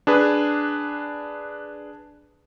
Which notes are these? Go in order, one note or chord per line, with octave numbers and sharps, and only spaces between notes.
D4 G#4 B4